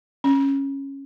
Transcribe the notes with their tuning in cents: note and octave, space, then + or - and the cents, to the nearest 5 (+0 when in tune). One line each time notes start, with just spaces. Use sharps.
C#4 -10